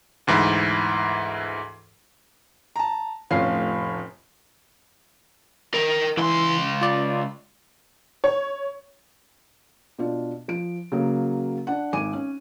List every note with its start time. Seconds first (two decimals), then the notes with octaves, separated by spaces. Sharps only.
0.27 D2 G#2 E3 E4
2.76 A5 A#5
3.30 F1 A2 C#4 F4 C7
5.74 D#3 A#4
6.17 C#2 E3 C6
6.81 F4 D5
8.24 C#5
9.98 B2 D4 F4
10.48 F3 D7
10.92 C#3 F#3 A#3
11.67 D4 F#5
11.93 G#1 G#5 D6 D#7
12.13 C#4